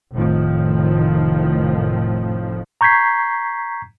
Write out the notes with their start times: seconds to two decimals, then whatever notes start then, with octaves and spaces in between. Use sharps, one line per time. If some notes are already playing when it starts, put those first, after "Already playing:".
0.13 F1 A2 D#3 F3
2.81 A#5 C#6 G6 G#6 B6 C7